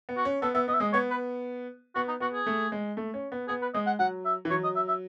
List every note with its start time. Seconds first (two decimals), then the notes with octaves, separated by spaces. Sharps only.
0.09 B3
0.17 F#4
0.25 C#4
0.42 B3 A4
0.54 B3 E5
0.68 B3 D#5
0.74 E5
0.80 G#3 D#5
0.93 B3 C#5
1.11 B4
1.95 B3 F#4
2.08 D#4
2.20 B3 F#4
2.34 G#4
2.47 A3
2.72 G#3
2.97 A3
3.14 C#4
3.32 B3
3.48 B3 G#4
3.62 B4
3.74 G#3 D#5
3.87 F#5
3.99 F#3 F#5
4.25 E5
4.45 E3
4.50 F#3 C#5
4.64 D#5
4.76 E5
4.88 E5